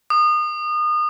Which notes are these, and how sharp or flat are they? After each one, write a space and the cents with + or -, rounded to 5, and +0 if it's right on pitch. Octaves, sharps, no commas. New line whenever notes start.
D#6 -30